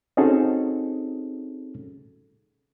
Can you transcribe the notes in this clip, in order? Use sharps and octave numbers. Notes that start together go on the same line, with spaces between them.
C4 C#4 D#4 F#4 G#4 A4